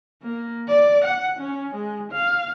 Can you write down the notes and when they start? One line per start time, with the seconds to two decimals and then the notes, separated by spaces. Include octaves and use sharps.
0.23 A#3
0.68 D5
1.05 F#5
1.39 C#4
1.75 G#3
2.12 F5